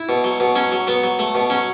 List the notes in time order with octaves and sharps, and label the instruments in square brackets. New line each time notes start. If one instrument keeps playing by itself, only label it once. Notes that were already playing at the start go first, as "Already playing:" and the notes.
Already playing: [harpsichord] E4
B2
F#3
B2
F#3 C#4
F#3
F#3 B3
F#3
A3
B2
F#3 C#4